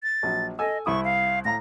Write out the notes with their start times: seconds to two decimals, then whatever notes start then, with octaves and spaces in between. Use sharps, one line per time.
0.03 A6
0.23 A#1 F#3
0.59 A4 D#5 G#5 E6
0.86 C2 E4 C#6 D#6
1.05 F5
1.45 A2 F5 A#5 A#6